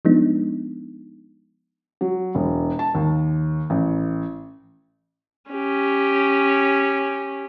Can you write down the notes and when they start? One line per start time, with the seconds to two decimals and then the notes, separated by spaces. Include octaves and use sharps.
0.05 F3 G#3 B3 D4 D#4
2.01 F#3
2.35 E1
2.79 A5
2.95 D#2
3.70 A1
5.51 C#4 G4